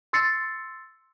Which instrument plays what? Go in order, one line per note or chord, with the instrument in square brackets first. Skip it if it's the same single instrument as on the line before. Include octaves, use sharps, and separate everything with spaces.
[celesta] C6 E6 A6 C7 C#7